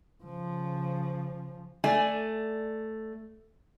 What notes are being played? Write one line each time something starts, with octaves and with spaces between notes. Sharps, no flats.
C#3 F3
A3 D5 G#5